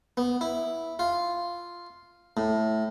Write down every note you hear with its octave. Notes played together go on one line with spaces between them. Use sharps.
B3
E4
F4
A2